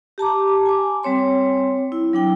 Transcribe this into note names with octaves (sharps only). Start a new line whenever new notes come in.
G4 A5 A#5 D6
G#5 D6
G3 C4 C#5 C6
E4
F#3 D4 G5